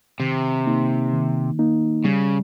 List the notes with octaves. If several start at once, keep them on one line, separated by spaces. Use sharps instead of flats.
C3 D#3
A#3 D#4
D#3
A#3 D#4
C#3 G3